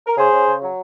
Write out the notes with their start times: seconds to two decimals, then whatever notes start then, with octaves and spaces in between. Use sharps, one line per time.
0.07 A#4
0.17 C#3 G#4 C5
0.32 C#3
0.47 C#3
0.62 F#3